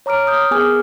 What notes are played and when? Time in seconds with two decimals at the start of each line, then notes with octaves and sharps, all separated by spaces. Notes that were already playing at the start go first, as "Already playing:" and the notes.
0.06 C#5 A#5 D6 F6 D7
0.27 D#6 F6 G6
0.51 B3 G#4 A#4 G#5 D6 F6